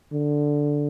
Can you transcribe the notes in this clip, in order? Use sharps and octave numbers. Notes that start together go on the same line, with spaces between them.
D3